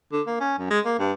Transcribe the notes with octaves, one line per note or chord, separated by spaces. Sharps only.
D3
A#3
C#4
F#2
G#3
A#3
G2